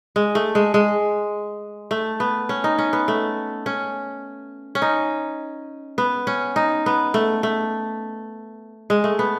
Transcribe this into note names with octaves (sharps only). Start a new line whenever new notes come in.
G#3
A3
G#3
G#3
A3
B3
C#4
D#4
C#4
B3
A3
C#4
C#4
D#4
B3
C#4
D#4
B3
A3
A3
G#3
A3
B3